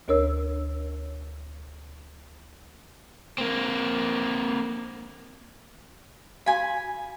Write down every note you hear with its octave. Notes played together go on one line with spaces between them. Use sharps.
D2 D4 A#4 C#5 E6
A#3 C4
F#4 F5 G#5 B5